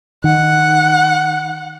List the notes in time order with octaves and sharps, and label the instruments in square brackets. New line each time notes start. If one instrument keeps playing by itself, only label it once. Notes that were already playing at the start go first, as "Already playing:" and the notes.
[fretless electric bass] D#3 [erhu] F#5